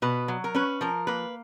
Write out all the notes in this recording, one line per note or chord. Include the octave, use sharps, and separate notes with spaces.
B2 B4
F#3
A#4
C#4 B4
F3 A#4
A#3 B4